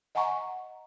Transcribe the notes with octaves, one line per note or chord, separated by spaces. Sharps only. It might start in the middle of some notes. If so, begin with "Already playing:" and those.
D#5 F#5 G#5 A#5 C#6